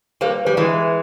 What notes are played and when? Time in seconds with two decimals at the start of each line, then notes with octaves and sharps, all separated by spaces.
0.21 G3 A#3 B4
0.45 G3 B4
0.57 E3 G#3
0.69 E5